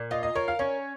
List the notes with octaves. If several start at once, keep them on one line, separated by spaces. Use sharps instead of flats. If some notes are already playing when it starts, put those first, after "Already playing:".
Already playing: A#2
F4 D#5
D#5
A#4 C#5
F5
C#4 C#5